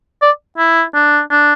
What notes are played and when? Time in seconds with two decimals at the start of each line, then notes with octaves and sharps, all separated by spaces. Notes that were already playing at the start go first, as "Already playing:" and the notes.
0.22 D5
0.58 E4
0.95 D4
1.31 D4